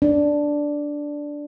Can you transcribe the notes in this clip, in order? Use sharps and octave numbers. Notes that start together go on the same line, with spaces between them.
D4